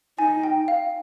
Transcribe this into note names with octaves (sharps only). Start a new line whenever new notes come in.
D#4 G#5
G5
F5